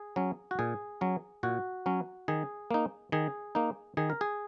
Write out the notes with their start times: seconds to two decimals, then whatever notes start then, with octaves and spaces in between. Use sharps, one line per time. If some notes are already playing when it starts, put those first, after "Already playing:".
Already playing: G#4
0.16 F#3 C#4
0.51 F#4
0.59 A#2 G#4
1.01 F#3 C#4
1.43 A#2 F#4
1.86 F#3 C#4
2.28 D#3 G#4
2.71 A#3 D#4
3.12 D#3 G#4
3.55 A#3 D#4
3.97 D#3 G#4
4.10 A#4
4.21 G#4